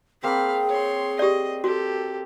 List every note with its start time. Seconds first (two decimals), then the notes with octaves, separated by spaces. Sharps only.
0.23 A#3 C4 G#4 F5 G5 B5
0.68 C#5 C6
1.19 G4 D5 D#5
1.64 F#4 G4 A4